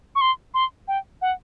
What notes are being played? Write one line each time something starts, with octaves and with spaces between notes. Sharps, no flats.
C#6
C6
C6
G5
F#5